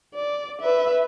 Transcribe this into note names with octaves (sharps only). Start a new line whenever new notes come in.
D5
B4 E5